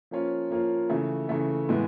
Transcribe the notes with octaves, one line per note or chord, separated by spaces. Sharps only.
F3 A#3 C#4 F4
F3 A#3 C#4 F4
C#3 E3 A3
C#3 E3 A3
A2 E3 G#3 B3